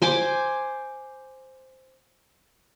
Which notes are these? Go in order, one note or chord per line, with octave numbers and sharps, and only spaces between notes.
C5 G#5 C6 D6